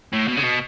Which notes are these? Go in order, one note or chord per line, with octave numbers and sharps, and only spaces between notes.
A2
B2
C#3
B2